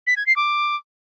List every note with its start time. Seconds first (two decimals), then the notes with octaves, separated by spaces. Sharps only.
0.07 B6
0.17 G#6
0.26 C7
0.36 D6